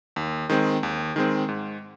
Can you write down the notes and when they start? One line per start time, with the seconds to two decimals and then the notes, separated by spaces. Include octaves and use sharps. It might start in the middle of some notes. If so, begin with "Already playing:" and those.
0.16 D#2
0.49 D#3 G#3 C4
0.83 D#2
1.16 D#3 G#3 C4
1.49 G#2